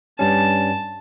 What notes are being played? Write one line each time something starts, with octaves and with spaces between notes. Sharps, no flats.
G2 G3 C#4 A5